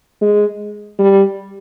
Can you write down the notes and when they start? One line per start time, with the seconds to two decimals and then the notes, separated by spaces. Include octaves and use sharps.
0.22 G#3
0.99 G3